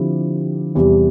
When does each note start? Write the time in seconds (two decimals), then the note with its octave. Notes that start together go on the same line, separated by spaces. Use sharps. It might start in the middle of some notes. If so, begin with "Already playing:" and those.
Already playing: D3 F3 C4 E4 G4
0.75 E2 C3 G3